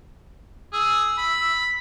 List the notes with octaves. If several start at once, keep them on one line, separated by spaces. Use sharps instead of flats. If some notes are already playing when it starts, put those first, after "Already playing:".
G#4 E6
B5